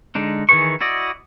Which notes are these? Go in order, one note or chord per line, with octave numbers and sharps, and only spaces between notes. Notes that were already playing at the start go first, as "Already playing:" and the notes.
D3 G#3 D4 D#4
D#3 E3 G#4 B4 C#6
E4 F#4 D5 D#5